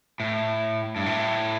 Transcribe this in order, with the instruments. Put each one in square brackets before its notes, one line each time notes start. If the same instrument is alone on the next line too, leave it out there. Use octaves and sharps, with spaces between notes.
[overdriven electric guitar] A2
G2
A2